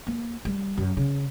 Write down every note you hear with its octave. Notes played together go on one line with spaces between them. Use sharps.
A#3
G3
F#2
C#3